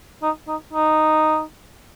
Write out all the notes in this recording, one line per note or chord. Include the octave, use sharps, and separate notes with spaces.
D#4
D#4
D#4